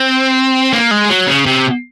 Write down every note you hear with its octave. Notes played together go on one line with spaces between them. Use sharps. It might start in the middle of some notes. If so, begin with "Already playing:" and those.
Already playing: C4
A#3
G#3
F#3
C#3
C3